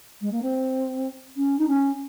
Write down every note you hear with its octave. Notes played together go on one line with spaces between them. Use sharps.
G#3
A#3
C4
C#4
D#4
C#4